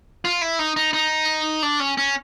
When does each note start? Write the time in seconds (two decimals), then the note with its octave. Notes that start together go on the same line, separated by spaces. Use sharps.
0.25 F4
0.41 E4
0.59 D#4
0.76 D#4
0.93 D#4
1.63 D4
1.80 C#4
1.98 C#4